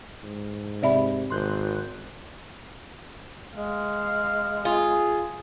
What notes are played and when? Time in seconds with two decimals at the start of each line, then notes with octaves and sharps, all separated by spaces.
0.24 G#2
0.83 C3 C4 G4 D5 E5 B5
1.30 G#1 C6 F#6 G6
3.54 G#3 F5
4.65 F4 G#4